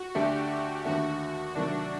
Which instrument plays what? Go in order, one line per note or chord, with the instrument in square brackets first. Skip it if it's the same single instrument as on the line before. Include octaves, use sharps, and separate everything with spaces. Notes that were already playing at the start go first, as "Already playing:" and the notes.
Already playing: [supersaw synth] F#4
[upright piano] D2 D3 A3 D4 [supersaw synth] G4
[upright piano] D#2 D3 A3 [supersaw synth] F#4
[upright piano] C3 D#3 F#3 A3 [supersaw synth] D4